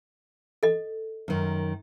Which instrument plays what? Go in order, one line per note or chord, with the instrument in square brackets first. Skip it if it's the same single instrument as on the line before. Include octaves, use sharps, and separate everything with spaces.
[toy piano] A4 D#5
[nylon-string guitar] F#2 D#3